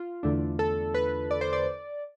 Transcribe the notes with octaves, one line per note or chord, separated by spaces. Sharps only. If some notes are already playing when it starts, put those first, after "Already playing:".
Already playing: F4
E2 D3 A3 D4
A4
B4
D5
C5
D5